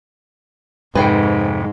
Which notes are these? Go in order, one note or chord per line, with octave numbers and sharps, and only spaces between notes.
F2 G#2 C3 B4 C5 G5